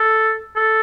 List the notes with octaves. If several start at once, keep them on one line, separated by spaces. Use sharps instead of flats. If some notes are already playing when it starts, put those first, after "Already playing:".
Already playing: A4
A4